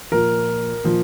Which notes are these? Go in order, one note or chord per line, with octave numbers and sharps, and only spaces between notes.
A#2 F3 A#4
A#2 F3